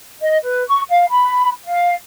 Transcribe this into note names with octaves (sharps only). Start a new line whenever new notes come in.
D#5
B4
C#6
F5
B5
F5